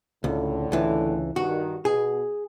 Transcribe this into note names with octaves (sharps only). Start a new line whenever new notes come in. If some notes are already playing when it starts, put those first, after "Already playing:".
C#2 A2 D3
C#2 E3
G2 D#3 F#4
B2 G#4